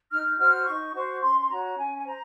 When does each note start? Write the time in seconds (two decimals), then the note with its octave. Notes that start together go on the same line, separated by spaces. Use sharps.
0.10 D#4 F6
0.38 F#4 C5 F6
0.66 D#4 C#6
0.94 F#4 C5 C#6
1.22 C#4 C6
1.39 C6
1.49 F#4 C#5 A#5
1.77 C#4 G#5
1.96 G#5
2.05 C5 A#5